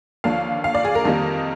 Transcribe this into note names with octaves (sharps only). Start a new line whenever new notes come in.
D#2 D3 F3 A#3 D4 F5
F5
D5
G#4
A#4
F2 D#3 G3 A#3 D#4